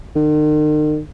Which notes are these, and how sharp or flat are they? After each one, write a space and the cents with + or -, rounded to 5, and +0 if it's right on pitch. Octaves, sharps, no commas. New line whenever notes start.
D#3 -40